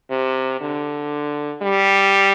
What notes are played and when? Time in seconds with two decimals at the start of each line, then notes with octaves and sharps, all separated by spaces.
0.10 C3
0.61 D3
1.62 G3